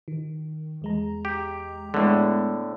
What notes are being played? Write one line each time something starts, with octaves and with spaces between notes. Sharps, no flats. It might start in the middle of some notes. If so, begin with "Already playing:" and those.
D#3
E2 G#3 A#5
G4
A2 D3 G#3 B3